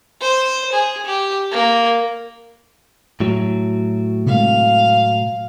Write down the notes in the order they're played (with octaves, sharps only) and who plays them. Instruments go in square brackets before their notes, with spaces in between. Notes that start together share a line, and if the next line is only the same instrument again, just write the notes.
[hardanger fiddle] C5
G#4
G4
A#3
[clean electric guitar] A2 F#3
[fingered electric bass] C3 G#3 A3 [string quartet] F5